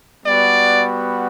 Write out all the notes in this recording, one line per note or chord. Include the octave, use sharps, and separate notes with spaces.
G3 B3 F#4 D5